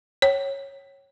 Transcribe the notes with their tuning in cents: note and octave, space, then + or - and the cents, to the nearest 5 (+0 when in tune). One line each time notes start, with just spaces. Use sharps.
C#5 -10 G5 -35